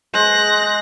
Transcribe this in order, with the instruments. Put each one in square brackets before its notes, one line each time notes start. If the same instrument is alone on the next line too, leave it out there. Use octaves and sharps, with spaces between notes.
[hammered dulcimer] G#3 C5 [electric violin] F#6 A#6